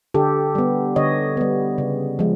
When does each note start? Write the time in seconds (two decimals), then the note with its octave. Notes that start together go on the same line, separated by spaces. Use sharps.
0.14 D3 G4 A4
0.55 G3 B3
0.96 D3 C#5 D#5
1.37 G3 B3
1.78 C#3
2.19 F3 G#3